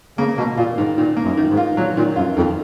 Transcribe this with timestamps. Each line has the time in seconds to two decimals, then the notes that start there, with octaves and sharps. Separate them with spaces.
0.18 C#3 A#3
0.37 B2 A#3
0.57 A#2 F4
0.77 G#2 D#3
0.97 A#2 D#3
1.17 A#3
1.24 F#2
1.37 D#3
1.50 G#2
1.57 F4
1.77 A#2 F#3
1.97 A#2 D#3
2.16 F#2 F4
2.36 F2 D#3